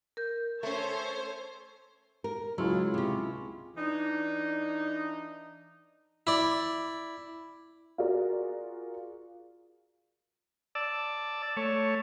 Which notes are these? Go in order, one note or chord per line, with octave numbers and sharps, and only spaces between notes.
A#4 G6
A3 C#4 A4 C5 C#5
A#4
C#2 F#3 E4 F4 G#4
C3 C#4
E3 D4 D#4
E4 D5
F4 F#4 G#4 A#4 D5
D5 A5 E6
A3 C#5